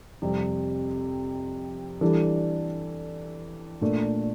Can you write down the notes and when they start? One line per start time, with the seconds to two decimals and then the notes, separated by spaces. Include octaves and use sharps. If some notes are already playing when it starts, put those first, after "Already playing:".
0.22 F2 C3 G3
2.01 E3 G3 D4 A4
3.81 A#2 A3 D4